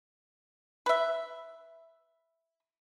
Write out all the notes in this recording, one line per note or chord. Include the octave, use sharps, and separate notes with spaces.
B4 E5